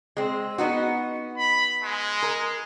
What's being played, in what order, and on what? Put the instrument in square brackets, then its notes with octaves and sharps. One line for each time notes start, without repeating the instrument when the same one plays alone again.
[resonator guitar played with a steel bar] G#3 C4
B3 D#4 F#4
[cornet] B5
G#3
[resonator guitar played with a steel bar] A#4